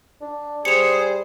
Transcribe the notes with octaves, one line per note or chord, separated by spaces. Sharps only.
D4
G3 G#4 C5 C#7 F7